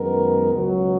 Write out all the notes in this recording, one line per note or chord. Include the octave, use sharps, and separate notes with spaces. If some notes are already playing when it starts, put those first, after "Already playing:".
Already playing: F#2 D#3 G#3 B3 A#4
C#2 B2 F#3